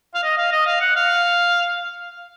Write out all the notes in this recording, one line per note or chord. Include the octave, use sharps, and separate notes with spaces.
F5
D#5
F5
D#5
F5
F#5
F5